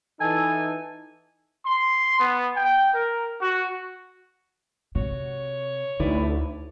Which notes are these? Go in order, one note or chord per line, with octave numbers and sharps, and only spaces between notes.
E3 D#4 A4 G#5
C6
B3
G5
A#4
F#4
C3 F#4 C#5
D2 D#4 E4 B4 D5